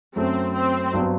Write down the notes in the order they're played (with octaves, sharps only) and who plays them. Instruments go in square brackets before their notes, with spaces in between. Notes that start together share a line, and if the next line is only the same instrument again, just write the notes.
[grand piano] F#2 F#3 A3 [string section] C4
[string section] C4
[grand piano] G2 F#3 B3